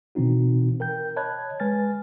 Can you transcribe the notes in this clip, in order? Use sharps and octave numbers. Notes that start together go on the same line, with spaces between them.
B2 E3 C4 D#4 F#4
A#4 G5 G6
C#5 D#5 A5 B5 F#6 G#6
G#3 B4 G#5 F6 A6